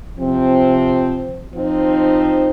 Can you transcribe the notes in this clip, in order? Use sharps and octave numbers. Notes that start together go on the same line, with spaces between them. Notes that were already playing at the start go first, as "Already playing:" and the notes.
C3 F3 C4
F3 C4 D#4